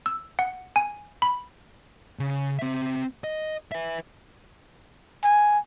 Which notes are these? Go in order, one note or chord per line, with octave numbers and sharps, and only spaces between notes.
E6
F#5
G#5
B5
C#3
C4 E5
D#5
B4 E5
G#5